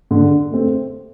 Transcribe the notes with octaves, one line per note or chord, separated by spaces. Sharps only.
D3
A3 C4